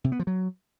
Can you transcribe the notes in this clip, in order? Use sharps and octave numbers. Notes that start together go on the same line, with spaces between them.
C3
B3
F3
F#3